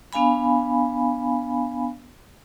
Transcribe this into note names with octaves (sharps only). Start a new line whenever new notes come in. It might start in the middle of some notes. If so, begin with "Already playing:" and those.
B3 D4 F5 G#5 B5